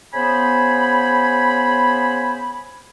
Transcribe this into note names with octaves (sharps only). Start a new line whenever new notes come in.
C#3 B3 C5 G#5 B5